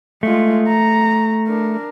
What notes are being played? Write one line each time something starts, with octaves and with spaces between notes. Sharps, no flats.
G#3 A3 F4
A#5
D4 A#4